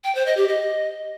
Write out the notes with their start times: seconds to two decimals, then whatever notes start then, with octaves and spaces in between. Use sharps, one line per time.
0.04 G5
0.15 C5
0.26 D#5
0.37 G4
0.48 D#5